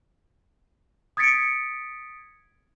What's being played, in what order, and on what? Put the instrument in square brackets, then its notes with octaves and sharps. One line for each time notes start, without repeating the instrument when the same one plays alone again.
[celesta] D#6 G#6 A6 B6 C#7 D7